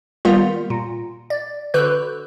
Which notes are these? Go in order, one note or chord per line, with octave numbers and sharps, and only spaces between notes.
D#3 G3 A#3 B3 F4
A#2
D5
D3 F#4 B4 F#6 G6